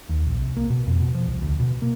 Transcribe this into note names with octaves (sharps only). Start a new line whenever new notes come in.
D#2
A#1
C2
A#3
B2
F2
B2
F3
C2
D2
B2
A#3